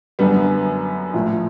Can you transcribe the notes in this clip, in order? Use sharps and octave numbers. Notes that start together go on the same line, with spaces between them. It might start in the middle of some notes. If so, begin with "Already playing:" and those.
F#2 D3 G3 B3
A#1 A2 F3